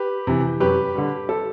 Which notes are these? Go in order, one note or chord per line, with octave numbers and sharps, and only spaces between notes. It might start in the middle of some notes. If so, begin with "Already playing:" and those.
Already playing: G4 B4
C3 E3
F#2 G4 B4
D3 G3
A4